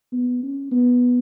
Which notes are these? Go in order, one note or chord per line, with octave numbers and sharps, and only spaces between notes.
B3
C#4
B3